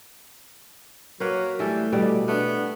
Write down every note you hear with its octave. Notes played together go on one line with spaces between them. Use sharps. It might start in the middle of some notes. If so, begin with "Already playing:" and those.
F#3 A#3 B4 C#5
E3 G3 A3 A4
B2 D3 G3 D5
A3 B3 D4